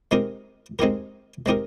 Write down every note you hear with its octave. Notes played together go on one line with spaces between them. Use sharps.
G#3 C4 D#4 G4 A#4
G#3 C4 D#4 G4 A#4
G#3 C4 D#4 G4 A#4